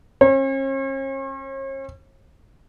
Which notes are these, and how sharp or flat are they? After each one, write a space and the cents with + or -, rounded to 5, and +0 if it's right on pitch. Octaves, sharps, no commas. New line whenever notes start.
C#4 -40 C#5 -45